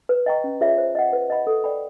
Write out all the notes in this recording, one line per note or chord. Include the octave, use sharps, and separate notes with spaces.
B4
D#5 G5 A#5 C#6
C#4
F4 G#4 C#5 E5
C5
D#5 F#5
B4
D#5 F#5 B5
A4
D5 G5 B5